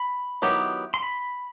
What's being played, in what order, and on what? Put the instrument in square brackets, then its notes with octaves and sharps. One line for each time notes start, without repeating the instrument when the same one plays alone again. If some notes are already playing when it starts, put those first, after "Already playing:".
Already playing: [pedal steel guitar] B5
[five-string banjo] D#3 F#3 B3 E4 G4
[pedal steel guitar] C6
B5